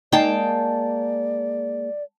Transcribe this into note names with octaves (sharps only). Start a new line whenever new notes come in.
G#3 A#3 D#4 D5 F5 G5 A5